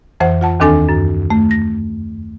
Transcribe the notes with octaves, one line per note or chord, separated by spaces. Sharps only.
F2 E3 C5 F#5
F4 F#5 A5
D#2 D#3 C4 D4 A4 G#5
F#2
A3
A#6